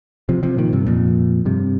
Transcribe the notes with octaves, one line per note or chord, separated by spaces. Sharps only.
C3 F3
C3 F3
A#2 D#3
G2 C3
F2 A#2
G2 C3